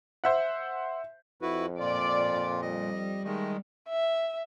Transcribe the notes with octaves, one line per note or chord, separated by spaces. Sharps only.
C5 E5 F#5
F2 E4 F#4 B4
A#2 F4 D5
G3 D#5
D#3 G#3 A3 D#5
E5